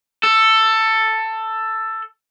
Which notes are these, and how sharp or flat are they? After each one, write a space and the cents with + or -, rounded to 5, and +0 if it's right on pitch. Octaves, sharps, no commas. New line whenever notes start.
A4 +10